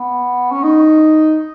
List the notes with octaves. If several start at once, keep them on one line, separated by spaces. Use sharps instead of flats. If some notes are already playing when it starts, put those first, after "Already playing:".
Already playing: B3
C#4
D#4